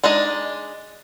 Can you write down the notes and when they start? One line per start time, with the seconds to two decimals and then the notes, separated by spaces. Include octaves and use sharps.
0.04 G#3 D4 D#4 D#5